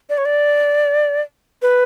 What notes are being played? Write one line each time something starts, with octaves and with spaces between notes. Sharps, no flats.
D5
C#5
D5
B4